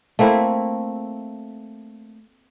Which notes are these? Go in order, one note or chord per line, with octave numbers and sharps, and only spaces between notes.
A3 A#3 C4 E4